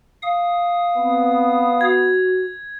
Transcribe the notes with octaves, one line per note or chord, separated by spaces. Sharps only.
F5 D#6
B3 C4
F#4 G#6